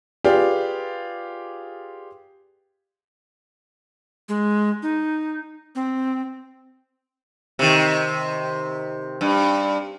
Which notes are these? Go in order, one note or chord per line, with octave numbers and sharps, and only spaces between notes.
F4 G4 G#4 B4 D5 F5
G#3
D#4
C4
C3 D#3
G2